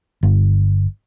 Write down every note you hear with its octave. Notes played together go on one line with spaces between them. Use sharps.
G1